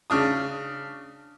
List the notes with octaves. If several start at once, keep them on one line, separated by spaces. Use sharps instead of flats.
C#3 D4 D#6